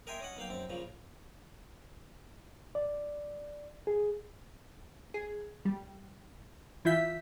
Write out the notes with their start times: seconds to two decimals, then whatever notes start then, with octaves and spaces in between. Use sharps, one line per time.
0.07 A#4 D#5 E5 G5 G#5 C6
0.20 C#4 D#5 F#5
0.37 B1 A#3 F5 G5
0.49 F#2 C4
0.70 A#2 C#3 F3
2.75 D5
3.87 G#4
5.14 G#4
5.65 G3
6.85 E3 E4 F4 E5 G6 B6